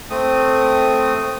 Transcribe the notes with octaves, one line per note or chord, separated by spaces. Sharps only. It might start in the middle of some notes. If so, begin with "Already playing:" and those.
A3 C4 D#6